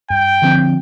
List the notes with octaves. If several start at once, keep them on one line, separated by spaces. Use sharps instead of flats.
G2 G5
D3 F3 C4